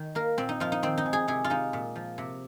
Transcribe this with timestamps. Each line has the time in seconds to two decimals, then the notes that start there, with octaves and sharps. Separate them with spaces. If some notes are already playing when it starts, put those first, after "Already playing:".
Already playing: D#3
0.15 A#3 A#4
0.38 A#2 C4
0.49 D#4
0.60 F3 F4
0.72 D#4
0.83 D#3 C4
0.98 D#4
1.06 G#3
1.13 G#4
1.28 C3 G#4
1.44 F4
1.50 G#3 D#4
1.73 A#2
1.96 F3
2.18 C3